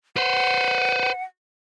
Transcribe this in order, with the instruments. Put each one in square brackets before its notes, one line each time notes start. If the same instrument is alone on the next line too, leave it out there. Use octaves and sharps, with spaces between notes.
[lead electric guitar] B4 C5 [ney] F#5